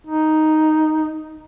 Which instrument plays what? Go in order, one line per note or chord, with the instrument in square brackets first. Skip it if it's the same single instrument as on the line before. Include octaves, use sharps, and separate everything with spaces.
[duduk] D#4